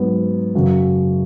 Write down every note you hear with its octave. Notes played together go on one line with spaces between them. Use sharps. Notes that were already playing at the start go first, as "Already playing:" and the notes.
Already playing: G#2 F#3 B3
F#2 C#3 F#3